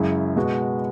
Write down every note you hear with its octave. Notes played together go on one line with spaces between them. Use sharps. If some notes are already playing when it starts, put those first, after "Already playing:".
Already playing: F#2 C#3 G#3 E4
B2 G#3 B3 F#4